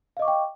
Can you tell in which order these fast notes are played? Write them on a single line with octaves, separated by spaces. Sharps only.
F5 D#5 D6 C#6 G5